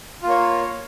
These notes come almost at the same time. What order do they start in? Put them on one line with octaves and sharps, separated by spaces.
F4 A#3 C#5